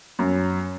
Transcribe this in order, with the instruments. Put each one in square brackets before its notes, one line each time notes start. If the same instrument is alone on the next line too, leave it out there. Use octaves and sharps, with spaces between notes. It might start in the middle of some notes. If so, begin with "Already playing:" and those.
[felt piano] F#2